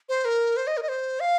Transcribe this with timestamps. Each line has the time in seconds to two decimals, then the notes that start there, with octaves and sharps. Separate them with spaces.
0.09 C5
0.25 A#4
0.57 C5
0.67 D#5
0.77 A#4
0.82 D#5
0.88 C5
1.20 F5